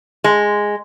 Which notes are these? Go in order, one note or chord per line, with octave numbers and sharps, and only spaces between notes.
G#3